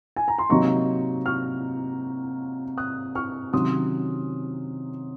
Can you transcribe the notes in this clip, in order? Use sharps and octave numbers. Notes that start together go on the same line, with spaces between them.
G#5
A#5
C6
C3 F#3 A#3 D#4 A#5 C#6
C#6 F6
D#6 F#6
C#6 F6
C3 D#3 F#3 C#4 C6 D#6